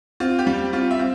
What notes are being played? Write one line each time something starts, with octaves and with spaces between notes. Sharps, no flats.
C4 F4
G4
G3
C4 F4
E5
C4